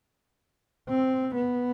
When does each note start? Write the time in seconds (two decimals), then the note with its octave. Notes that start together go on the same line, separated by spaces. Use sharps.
0.90 C4
1.36 B3